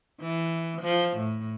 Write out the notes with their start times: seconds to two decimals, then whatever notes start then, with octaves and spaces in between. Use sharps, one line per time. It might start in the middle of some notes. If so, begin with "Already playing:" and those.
0.21 E3
0.82 F3
1.17 A2